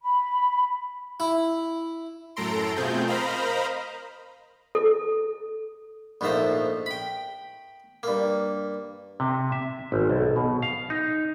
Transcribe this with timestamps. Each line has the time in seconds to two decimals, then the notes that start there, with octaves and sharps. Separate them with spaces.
0.02 B5
1.20 E4
2.36 F#2 A2 A4 A#5 C6 D7
2.76 B2 A3 C4 F4 G#4 G6
3.07 A#4 C5 D#5 F5 A#5 B5
4.75 A4
6.21 A#1 G#2 F3 A3 C5 A#5
6.86 G5 B5
8.03 G2 A#3
9.20 C3
9.52 E5
9.92 G#1
10.09 B1
10.36 B2
10.62 F5
10.90 D#4